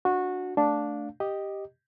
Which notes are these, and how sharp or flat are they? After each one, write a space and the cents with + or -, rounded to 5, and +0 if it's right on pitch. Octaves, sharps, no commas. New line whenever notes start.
D4 +0 F#4 -20
A3 +0 D4 -5 F5 +15
G4 +0 D#5 -5